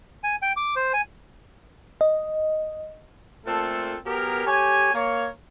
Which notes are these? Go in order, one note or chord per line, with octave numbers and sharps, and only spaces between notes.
G#5
G5
D6
C5
G#5
D#5
A#2 A3 C4 A4
F#3 B3 G4 G#4 A#4
A3 G4 C#5 G#5
A#3 C#5